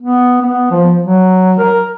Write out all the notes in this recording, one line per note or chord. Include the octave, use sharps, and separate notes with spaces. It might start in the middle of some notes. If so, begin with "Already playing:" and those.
B3
B3
F3
F#3
A#4